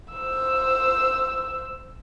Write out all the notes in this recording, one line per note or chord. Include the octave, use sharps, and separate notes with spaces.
C5 E6